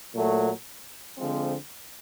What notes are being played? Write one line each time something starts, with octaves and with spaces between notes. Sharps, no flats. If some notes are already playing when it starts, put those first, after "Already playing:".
A#2 F#3 A3
D3 F3 G#3 C4